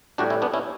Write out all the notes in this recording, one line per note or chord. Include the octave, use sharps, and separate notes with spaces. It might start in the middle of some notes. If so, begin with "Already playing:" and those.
A2 G3 D4 F#4
C#4 E4
B3 D4
C#4 E4